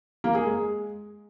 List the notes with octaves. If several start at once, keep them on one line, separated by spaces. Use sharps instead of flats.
A#3
G#4
G#3